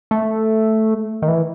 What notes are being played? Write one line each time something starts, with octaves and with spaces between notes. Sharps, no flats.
A3
D#3
E3